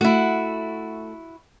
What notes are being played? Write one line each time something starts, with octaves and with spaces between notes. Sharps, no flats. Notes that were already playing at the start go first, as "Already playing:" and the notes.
A3 E4 F#4 F#5